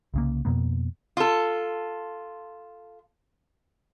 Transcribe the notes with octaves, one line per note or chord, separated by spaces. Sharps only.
C2 C#3 A#3
F2 B2 A#3 B3
F4 A4